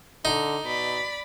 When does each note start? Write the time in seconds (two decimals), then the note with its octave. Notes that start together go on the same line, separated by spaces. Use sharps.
0.25 D3 D#4
0.65 B2 D5 B5